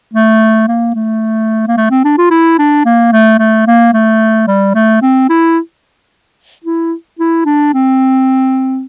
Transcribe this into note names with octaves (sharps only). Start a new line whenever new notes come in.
A3
A#3
A3
A#3
A3
C4
D4
F4
E4
D4
A#3
A3
A3
A#3
A3
G3
A3
C4
E4
E4
E4
D4
C4